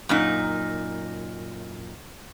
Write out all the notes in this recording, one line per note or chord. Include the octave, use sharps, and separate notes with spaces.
F#2 A#2 D#4